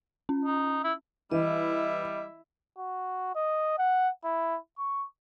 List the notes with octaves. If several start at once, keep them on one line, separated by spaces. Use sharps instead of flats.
C#4
D#4
E4
E3 G3 E4 D#5 E5
F#4
D#5
F#5
E4
C#6